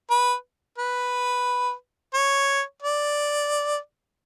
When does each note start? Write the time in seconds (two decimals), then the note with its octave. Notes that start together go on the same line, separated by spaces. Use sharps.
0.10 B4
0.78 B4
2.14 C#5
2.82 D5